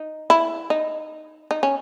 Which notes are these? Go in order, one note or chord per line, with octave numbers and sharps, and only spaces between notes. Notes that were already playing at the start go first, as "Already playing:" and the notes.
Already playing: D#4
E4
D#4
D#4
C#4